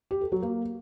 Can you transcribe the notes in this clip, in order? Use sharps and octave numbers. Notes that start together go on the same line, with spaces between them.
G4
A4
F#3
A#3